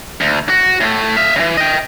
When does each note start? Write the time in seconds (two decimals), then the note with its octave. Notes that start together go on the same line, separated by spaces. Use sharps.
0.21 D2
0.49 F#4
0.80 A2 A3
1.17 E5 F5
1.36 C#3 E3
1.57 D#5 G5